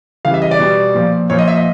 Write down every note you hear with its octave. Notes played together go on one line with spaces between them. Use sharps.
C#3 E3 G3 F5
E5
D#5
D5
B2 G3
A#2 F3
A#2 F3 C#5
D#5
E5
D#5